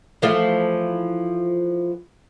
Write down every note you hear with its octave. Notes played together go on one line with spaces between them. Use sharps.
E3 F3 A3